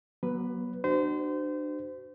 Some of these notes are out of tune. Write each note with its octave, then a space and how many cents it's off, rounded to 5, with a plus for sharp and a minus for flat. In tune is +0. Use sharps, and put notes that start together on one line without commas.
F#3 +15 B3 -40 B4 +5
D4 +35 F#4 +30 C5 -30